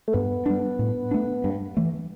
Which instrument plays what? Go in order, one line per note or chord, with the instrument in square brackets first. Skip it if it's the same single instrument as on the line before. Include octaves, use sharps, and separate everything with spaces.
[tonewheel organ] A3
[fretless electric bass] G2 [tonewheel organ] B3
[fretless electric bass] G3 D4
A2
A3 D4
G2
E3 A3